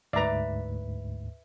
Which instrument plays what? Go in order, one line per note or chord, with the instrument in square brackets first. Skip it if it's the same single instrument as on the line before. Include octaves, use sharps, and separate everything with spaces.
[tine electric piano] D2 G#2 [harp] B4 E5 [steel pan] D5 A#5